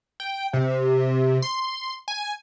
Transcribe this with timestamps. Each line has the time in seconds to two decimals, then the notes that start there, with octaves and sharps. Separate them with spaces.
0.20 G5
0.53 C3
1.42 C6
2.08 G#5